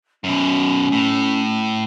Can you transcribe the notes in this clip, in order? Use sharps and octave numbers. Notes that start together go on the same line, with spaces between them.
F#2 B2 C#4
A2